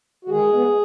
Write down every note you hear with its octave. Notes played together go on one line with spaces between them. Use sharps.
F#4
D#3 G#3 G#4
G#3 B3